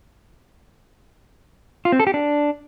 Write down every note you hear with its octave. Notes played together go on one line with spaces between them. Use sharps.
F4
C4
A4
G4
D4